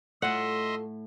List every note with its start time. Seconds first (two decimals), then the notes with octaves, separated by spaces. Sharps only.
0.22 A2 A3 F4 D#5 E5 F#5 C6